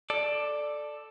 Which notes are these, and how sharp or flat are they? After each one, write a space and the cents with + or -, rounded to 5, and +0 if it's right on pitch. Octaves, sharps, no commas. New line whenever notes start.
A4 +0 D5 +10